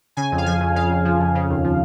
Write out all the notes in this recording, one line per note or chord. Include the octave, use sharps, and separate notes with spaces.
C#3 G#5
F2
F5
F3 G#5
F2
C#3 F5
F2
F3
F2
C#3
D#2
F3